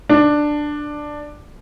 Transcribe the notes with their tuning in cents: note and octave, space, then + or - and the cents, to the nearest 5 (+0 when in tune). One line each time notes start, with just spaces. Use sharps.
D4 +10